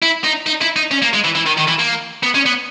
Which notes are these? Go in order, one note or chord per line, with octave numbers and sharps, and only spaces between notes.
E4
D#4
D#4
E4
D#4
C#4
A#3
G#3
E3
E3
D#3
D#3
E3
A#3
B3
C#4
B3